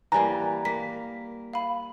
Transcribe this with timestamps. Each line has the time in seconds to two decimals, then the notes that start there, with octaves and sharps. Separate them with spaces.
0.12 E3 G3 A#3 G#5 A#5
0.65 A#3 B6
1.53 F5 B5